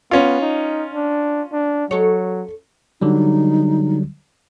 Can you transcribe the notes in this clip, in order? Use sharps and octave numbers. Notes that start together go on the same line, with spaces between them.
B3 C#4 F4
D#4
D4
D4
F#3 A4 C#5
D3 F#3 G3 D#4